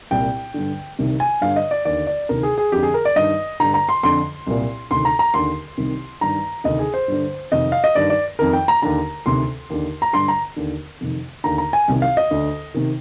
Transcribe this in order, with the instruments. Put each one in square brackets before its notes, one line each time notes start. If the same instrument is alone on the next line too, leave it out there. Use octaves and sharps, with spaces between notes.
[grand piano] C2 A#2 G5
G2 D3
C2 C3 D#3
G#5
G2 D3 F5
D#5
D5
D#2 D3 D5
D5
D2 C3 D#3 A#4
G#4
G#4
F2 D3 G4
G#4
A#4
D5
G2 D#3 D#5
G2 D3 A#5
A#5
C6
F2 D3 C6
C2 A#2
D2 C3 D#3 C6
A#5
A#5
D#2 D3 C6
C2 C3 D#3
G2 D#3 A#5
D2 C3 D#3 D#5
G#4
C5
G2 D3
F2 C3 D#3 D#5
F5
D#5
G2 D#3 D5
D5
F2 D#3 A#4
G5
A#5
D#2 D3 A#5
D2 C3 D#3 C6
D#2 D3
A#5
G2 D3 C6
A#5
D#2 D3
F2 C3 D#3
D#2 D3 A#5
A#5
G#5
C2 C3 D#3
F5
D#5
D2 D3
C3 D#3